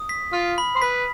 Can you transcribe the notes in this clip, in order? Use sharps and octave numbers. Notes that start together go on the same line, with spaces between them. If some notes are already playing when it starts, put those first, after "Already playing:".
Already playing: D#6
B6
F4 F6
B5
C5
B4 B6